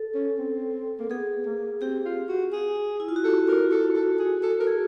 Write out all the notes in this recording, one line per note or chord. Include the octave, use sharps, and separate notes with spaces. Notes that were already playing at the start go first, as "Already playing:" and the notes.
Already playing: A4
C#4
C4
A#3
B3 G#4
A#3
C4 G4
F4
F#4
G#4
E4
F4
F#4
G4 A4
A#4
A4
F#4 A4
G#4
A4
A#4
G#4 A4